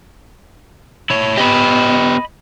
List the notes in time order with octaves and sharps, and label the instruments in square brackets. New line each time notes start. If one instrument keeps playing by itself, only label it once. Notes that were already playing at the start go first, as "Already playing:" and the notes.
[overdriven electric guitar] E4 C#5
[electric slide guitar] B3 G4 [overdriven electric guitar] D#5 B5